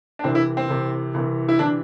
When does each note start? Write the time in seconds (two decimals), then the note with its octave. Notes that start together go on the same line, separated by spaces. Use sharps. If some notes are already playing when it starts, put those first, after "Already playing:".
0.19 D4
0.24 C2 C3 E3 C4
0.35 E4
0.57 C4
0.69 C2 C3 E3
1.14 C2 C3 E3
1.49 E4
1.59 C3 E3 D4